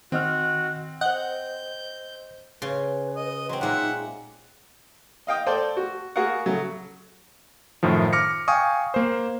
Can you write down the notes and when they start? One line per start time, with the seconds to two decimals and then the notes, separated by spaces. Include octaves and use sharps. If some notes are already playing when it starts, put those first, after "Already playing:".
0.12 D#3 C4 F#4 D#5 F6
1.01 C5 D#5 F#5 G6
2.62 C#3 B4 C6
3.16 D#5
3.49 F#3 C4 C5
3.61 A#2 G#3 A#3 D#4 E5 F#5
5.27 D#5 F5 G5 D#6
5.46 A4 C5 D5 F5 G5 A5
5.77 F#4
6.16 A#3 F#4 G#4 A#4 F5 F#5
6.46 C#3 F#3 A3
7.83 F#2 A2 D#3 F3
8.13 D6 F6 A#6 C#7
8.48 F5 G5 G#5 C#6 D#6
8.94 A#3 C5